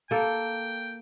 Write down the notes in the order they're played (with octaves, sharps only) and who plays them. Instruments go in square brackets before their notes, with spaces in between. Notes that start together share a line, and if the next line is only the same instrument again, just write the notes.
[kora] A#3 A4 [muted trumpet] G5